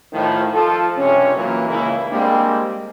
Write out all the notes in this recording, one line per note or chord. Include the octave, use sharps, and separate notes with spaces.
A2 D#3 F3
F3 F4 A4
C#2 G2 C3 C#4
A#2 E3 F#3 A#3
G#1 C#2 C#3 A#3 E4
G3 G#3 A#3 C4 D4 G4